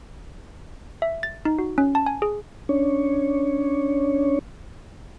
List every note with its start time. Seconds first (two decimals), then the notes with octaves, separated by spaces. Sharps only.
1.02 E5
1.23 A6
1.45 D#4
1.59 F#4
1.78 C#4
1.95 A5
2.06 G#5
2.22 G#4
2.69 C#4 D4 C#5